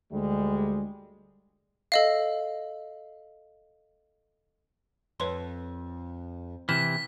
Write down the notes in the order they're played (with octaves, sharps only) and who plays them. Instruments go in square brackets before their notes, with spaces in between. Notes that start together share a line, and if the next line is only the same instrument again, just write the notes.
[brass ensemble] D2 G3 G#3
[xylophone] A4 D#5 F5
[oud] F2 [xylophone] B4 C#5 C6
[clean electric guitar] C3 E3 [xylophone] F6 G6 E7 [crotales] B6